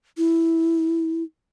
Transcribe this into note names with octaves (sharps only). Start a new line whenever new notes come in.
E4